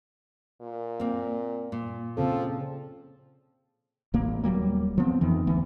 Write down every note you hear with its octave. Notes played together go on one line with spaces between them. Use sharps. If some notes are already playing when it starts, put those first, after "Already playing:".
A#2
A#3 C4
A#2
C#3 F3 C4 A4
A1 A2 A#3
D#1 F#3 G3 A#3
F3 B3 C4
F2 D#3 E3
D2 E3 B3